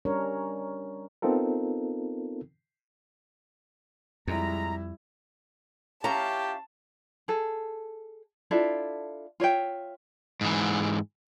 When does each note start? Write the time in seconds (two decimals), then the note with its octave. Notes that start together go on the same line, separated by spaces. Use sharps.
0.05 G3 C#4 D4 A#4 C#5
1.22 B3 C4 D#4 F4 A4 A#4
4.27 F2 G3 G#3 E4 A#5
6.04 C#4 E4 F4 G4 A5 A#5
7.28 G#4 A4
8.51 D4 E4 F4 A4
9.40 F4 C#5 E5 G5
10.41 G#2 E3